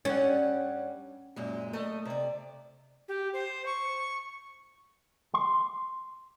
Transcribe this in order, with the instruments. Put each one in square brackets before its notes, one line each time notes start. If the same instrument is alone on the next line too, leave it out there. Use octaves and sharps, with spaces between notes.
[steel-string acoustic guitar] G2 G3 F#5 [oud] C#4
[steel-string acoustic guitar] F#2 A#2 G#3
A3 A4 D#5
C3 D5
[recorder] G4
C5
C#6
[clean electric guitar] C6